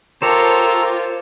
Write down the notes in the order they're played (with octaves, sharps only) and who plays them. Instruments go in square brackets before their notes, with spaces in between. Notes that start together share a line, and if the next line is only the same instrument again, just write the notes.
[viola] F4 A#4 [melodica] G4 A4 A#5 [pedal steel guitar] C5 C#5 A5